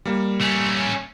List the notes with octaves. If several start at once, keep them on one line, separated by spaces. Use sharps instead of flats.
G3 A#3
A3 C#4